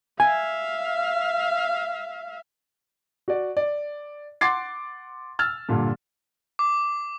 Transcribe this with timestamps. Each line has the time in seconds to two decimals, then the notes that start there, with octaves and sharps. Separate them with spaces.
0.20 E5 F5 G#5
3.28 F#4 D5
3.57 D5
4.41 F#5 C6 D6 A6 C7
5.39 E6 F6 A6
5.69 G2 A#2 D3
6.59 D6